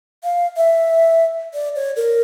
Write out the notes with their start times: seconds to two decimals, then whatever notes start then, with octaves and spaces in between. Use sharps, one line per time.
0.24 F5
0.56 E5
1.54 D5
1.75 C#5
1.96 A#4